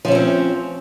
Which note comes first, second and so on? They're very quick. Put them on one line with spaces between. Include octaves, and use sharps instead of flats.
F3 C#4 G3 C4